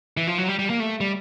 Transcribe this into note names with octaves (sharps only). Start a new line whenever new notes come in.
E3
F3
F#3
G3
G3
A#3
A3
G3